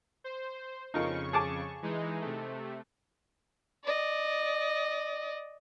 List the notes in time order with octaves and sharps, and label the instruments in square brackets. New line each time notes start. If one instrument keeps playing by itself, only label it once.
[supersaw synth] C5
[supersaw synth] F2 C#3 C#6 [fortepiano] D#4 F4 A#4
[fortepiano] G#4 A5 D6
[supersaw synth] E3 G#3 D#4
C3 A3
[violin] D5 D#5